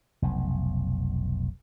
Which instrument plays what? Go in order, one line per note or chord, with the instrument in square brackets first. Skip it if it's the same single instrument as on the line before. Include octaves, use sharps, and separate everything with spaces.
[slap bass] F1 B1